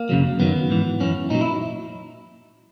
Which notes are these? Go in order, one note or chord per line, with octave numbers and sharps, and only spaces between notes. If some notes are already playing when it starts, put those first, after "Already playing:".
Already playing: A#3
F#2 C#3 F#3
F#2 D#3 F#3 B3
G#2 E3
F#2 E3 C#4
A#2 F#3 D#4
E4